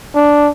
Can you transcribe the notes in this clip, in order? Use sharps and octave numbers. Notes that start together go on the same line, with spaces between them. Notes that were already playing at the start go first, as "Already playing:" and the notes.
D4